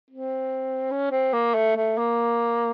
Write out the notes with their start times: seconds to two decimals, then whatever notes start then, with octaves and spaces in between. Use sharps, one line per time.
0.11 C4
0.91 C#4
1.11 C4
1.33 A#3
1.54 A3
1.77 A3
1.98 A#3